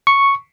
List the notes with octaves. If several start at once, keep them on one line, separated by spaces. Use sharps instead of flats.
C#6